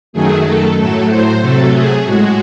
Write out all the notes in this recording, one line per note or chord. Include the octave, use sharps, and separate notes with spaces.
F#2 D#3 F#3 A3 G#4
A4
A2 F#3 A3 A4
C5
C3 F#3 A3 A4
G#4
A2 G#3 F#4